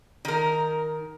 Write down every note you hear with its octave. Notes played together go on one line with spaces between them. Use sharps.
D#3 A#4